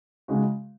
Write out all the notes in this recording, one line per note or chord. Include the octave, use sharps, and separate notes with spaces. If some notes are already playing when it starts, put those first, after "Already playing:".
C#3 G#3 D#4 F#4